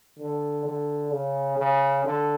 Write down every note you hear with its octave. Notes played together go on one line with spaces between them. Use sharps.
D3
D3
C#3
C#3
D3